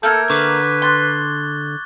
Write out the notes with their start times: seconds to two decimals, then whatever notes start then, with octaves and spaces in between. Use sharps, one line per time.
0.03 A3 A#3 A4 A#4 G6 G#6
0.30 D3 B4 C#6 D6
0.82 C6 F#6 A6 G7